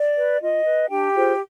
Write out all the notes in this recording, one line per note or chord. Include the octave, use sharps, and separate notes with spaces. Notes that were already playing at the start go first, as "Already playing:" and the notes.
Already playing: D5
B4
F4 D#5
B4
D4 G4 G5
F4 G#4 C5